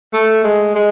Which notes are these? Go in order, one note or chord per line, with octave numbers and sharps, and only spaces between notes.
A3
G#3
G#3